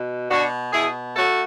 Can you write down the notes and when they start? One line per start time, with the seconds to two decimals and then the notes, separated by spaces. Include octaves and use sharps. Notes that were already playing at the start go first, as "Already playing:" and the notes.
Already playing: B2
0.31 B2 D4 F#4
0.73 B2 E4 G#4
1.16 A3 F#4 A4